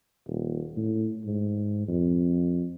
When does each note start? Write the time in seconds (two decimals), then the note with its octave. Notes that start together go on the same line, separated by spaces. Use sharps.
0.27 D#1
0.76 A2
1.25 G#2
1.88 F2